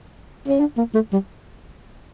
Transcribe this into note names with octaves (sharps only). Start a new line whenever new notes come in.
C#4
D4
A#3
A3
G3